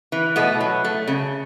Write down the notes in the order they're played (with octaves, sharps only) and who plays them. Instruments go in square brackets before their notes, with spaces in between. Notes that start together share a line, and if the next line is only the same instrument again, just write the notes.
[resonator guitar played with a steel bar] E3
B2 A3 B3
F#3
A3
C#3